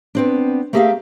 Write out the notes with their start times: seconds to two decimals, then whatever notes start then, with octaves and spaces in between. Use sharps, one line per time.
0.15 B3 C4 D4
0.73 A3 A#3 G4 G#4 E5 F5